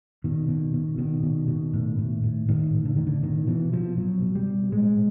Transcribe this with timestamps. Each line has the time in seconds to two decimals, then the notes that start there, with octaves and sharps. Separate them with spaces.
0.24 B2 D#3
0.48 B2
0.74 B2
0.98 B2 D#3
1.23 B2
1.48 B2
1.73 A2
1.99 A2
2.24 A2
2.48 A2 D#3
2.74 A2
2.85 D3
2.96 A2 D#3
3.07 D3
3.22 B2 D#3
3.47 B2 E3
3.73 B2 F3
3.97 B2 F#3
4.22 B2
4.35 G3
4.47 B2
4.72 A2 G#3